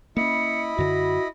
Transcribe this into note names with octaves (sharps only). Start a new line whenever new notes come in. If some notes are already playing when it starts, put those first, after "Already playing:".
A#3 C#4 E4 D#5 B5 C#7
F#2 D3 F#4 A#6